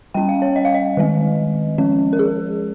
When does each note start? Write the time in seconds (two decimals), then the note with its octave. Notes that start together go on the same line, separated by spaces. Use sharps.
0.14 G3 C#4 G5
0.29 F5
0.42 C#5
0.56 D#5
0.65 F5
0.74 D#5
0.97 D#3 G#3 C4
1.78 F3 G#3 C#4
2.13 A#4
2.19 G#4